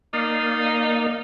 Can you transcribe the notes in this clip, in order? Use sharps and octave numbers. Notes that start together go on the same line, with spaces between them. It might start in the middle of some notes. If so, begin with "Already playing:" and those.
A#3 D#4 D5 F5